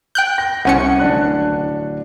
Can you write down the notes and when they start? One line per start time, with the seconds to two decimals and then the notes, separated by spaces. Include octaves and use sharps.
0.15 G5 F#6 G6
0.38 A#6
0.65 C2 C#4 F#5 C#7
0.99 D1 D4 F#6